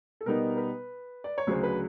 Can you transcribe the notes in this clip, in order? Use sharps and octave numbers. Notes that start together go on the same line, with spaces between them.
A4
B2 G3 B3 D#4 A#4
B4
D5
C#5
D2 C#3 F#3 C5
B4